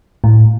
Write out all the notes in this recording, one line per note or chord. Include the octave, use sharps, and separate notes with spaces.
A2